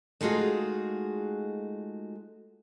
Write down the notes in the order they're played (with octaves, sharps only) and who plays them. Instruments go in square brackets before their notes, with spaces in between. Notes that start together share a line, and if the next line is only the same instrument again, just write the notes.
[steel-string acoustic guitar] G#3 A3 D#4 F4 F#4 G#4